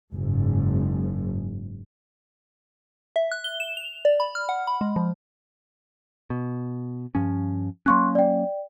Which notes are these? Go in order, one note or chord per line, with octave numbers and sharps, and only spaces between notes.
F#1 G#2
E5
F#6
G7
E7
F7
D5
B5
F6
F#5
B5
G#3
F3
B2
G2 F3 C#4
F#3 A#3 C#4 C6 C#6 F#6
D5 G5